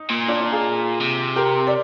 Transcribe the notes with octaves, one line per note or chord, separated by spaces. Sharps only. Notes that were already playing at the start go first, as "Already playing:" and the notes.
Already playing: D#4
A#2
D4 F4
D4 F4
F4 G#4
C3
G4 A#4
D5